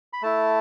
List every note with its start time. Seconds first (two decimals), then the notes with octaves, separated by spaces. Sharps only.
0.13 B5
0.22 A3 E4 A5